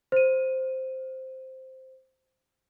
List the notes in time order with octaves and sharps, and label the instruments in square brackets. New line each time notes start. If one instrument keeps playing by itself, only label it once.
[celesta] C5 D#7